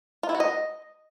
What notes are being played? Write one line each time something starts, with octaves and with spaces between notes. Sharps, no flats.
F4
E4
F#4
D#5